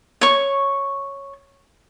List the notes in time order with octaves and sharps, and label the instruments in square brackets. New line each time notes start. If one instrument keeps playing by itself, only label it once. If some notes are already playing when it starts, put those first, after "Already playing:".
[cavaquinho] C#5 C#6